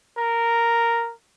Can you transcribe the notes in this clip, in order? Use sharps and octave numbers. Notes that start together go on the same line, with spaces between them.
A#4